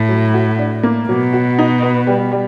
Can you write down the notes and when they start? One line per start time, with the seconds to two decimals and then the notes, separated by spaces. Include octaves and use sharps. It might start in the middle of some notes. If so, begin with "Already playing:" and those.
Already playing: A2
0.09 F#3
0.34 F#4
0.59 D4
0.83 A#3
1.08 B2 F#3
1.33 F#4
1.58 D#4
1.82 B3
2.07 G3
2.32 G3